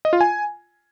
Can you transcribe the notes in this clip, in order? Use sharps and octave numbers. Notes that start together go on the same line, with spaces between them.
D#5
F4
G#5